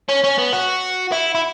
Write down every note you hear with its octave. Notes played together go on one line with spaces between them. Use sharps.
C#4
C#4
B3
F#4
E4
E4